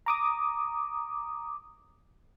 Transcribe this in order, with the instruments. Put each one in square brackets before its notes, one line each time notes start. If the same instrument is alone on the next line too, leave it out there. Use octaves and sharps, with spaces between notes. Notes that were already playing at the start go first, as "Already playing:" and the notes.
[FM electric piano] A#5 D6 D#6